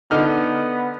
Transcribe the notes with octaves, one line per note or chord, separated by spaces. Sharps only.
D3 B3 D#4 F6